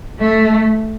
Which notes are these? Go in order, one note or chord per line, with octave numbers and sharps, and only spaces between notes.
A3